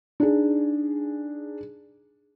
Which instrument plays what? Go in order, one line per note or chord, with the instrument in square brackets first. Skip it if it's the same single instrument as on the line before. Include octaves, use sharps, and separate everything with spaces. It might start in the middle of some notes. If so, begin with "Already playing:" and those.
[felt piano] D4 D#4 G#4